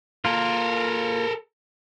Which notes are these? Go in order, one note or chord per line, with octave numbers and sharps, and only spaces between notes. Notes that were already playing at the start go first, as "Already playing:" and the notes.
A#3 F4 A4 A#4